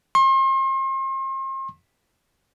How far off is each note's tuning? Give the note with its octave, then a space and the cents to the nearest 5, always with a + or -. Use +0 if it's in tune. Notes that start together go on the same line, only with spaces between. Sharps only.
C6 +40